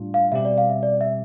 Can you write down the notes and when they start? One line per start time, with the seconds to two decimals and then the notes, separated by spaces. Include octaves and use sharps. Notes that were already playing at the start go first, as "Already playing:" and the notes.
Already playing: A2 G3 D4 F4
0.14 F5
0.32 B2 G3 C4 G4 E5
0.45 D5
0.58 F5
0.70 E5
0.83 D5
1.01 E5